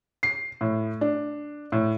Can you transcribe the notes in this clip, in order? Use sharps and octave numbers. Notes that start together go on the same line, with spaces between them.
C7
A2
D4
A2